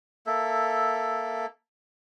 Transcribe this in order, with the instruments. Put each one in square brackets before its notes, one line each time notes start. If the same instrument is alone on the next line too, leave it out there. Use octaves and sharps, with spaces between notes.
[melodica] A#3 A4 E5